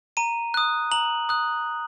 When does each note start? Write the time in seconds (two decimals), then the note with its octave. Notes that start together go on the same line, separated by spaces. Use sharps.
0.17 A#5 D#7
0.54 D#6 F#6
0.92 A#5 F#7
1.29 D#6 F#6